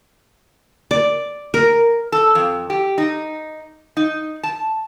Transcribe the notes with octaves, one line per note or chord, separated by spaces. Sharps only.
D5
A#4
A4
F2
G4
D#4
D#4
A5